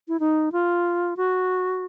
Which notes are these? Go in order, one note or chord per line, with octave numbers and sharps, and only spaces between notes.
E4
D#4
F4
F#4